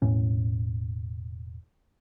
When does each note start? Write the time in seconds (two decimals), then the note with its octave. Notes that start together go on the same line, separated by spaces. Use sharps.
0.02 E1 A2 C#4